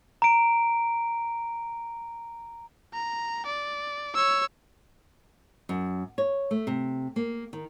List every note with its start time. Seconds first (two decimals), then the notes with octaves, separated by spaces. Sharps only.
0.22 A#5 D7
2.94 A#5
3.46 D5
4.14 C#5 E6
5.69 F#2
6.18 C#5
6.51 A3
6.67 C3
7.16 A#3
7.53 D#3